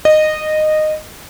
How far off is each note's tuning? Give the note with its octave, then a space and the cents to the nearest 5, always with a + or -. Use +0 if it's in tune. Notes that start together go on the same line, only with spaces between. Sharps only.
D#5 -15